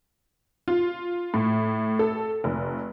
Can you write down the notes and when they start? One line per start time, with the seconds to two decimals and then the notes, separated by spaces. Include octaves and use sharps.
0.68 F4
1.34 A2
1.99 A4
2.44 F1